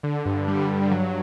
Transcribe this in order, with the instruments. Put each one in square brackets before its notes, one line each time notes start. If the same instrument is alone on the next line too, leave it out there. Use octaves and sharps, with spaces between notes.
[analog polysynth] D3
G2
G3
G2
F#3